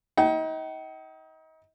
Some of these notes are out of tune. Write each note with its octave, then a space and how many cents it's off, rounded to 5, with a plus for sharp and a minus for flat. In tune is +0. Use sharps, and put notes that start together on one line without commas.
D#4 +35 G5 -40